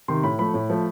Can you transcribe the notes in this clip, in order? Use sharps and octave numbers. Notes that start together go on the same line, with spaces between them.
C3 D#3 C6
A2 B5
F3 A3 B5
A2
F3 A3